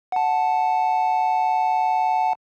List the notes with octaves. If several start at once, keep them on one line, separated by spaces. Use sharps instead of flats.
F#5 A5